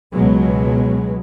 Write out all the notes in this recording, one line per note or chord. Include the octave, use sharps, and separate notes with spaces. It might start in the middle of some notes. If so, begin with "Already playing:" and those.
C#2 B2 F#3 G#3 B3